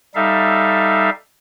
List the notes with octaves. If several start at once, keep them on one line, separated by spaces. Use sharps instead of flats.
G3 D#4 A4 E5 F5